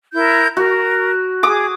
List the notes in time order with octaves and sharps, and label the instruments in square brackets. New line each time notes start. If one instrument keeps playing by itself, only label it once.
[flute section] E4 A#4 G6
[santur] F#4 [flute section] A#4
[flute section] G#4 [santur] D6 D#6